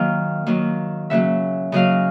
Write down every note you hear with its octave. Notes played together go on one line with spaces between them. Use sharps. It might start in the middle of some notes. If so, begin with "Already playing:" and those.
Already playing: D#3 F#3 A#3 F5 G5
D#3 F#3 A#3
C#3 F#3 A#3 E5 F#5
C#3 F#3 A#3 D#5 F5